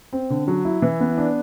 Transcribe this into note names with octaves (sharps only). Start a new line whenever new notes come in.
C4
D3
F#3
E4
E3
B3
D4